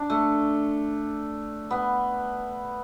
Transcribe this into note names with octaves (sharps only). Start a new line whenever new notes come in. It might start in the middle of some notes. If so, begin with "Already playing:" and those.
Already playing: D4
A3
B3